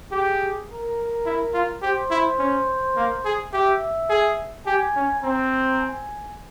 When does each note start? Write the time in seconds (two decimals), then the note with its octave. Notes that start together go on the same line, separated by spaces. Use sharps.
0.11 G4 G#4
0.68 A#4
1.26 E4
1.53 F4
1.82 G4 C5
2.11 E4
2.39 C#4
2.96 A#3
3.25 G#4
3.53 G4 E5
4.09 G#4
4.67 G4 G#5
4.96 C#4
5.23 C4 A#5
5.81 G#5